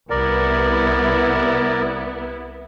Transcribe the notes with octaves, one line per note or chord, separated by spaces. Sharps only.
C2 B3 E4 A#4 D5